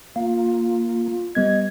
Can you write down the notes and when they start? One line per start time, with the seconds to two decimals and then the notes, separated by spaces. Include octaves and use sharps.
0.16 A#3 F4
1.35 G3 B3 D#5 G#6